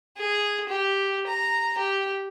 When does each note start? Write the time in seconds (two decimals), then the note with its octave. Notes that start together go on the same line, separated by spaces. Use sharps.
0.18 G#4
0.69 G4
1.27 A#5
1.78 G4